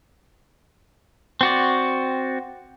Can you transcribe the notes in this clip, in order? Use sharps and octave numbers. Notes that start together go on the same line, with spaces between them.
C4 F#4 D5